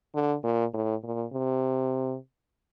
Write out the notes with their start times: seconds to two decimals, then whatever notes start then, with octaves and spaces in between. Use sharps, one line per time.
0.15 D3
0.44 A#2
0.74 A2
1.03 A#2
1.33 C3